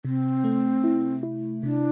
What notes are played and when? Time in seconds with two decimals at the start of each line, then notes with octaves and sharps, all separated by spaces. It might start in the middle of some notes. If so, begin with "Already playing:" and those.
0.05 C3 C4
0.44 A3
0.84 E4
1.23 E4
1.63 C3 D4